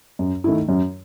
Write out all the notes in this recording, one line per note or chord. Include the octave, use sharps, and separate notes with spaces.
F#2
D#3 A3 E4
F#2